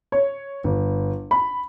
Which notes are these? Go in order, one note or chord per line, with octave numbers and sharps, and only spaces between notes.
C#5
G1
B5